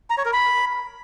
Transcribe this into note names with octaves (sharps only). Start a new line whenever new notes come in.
A#5
C#5
A#4
B5